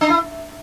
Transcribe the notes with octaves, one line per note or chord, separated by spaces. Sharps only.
D4
E4